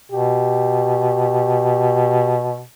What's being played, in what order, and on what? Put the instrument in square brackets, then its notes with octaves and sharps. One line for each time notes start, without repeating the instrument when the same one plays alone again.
[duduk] B2 [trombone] G4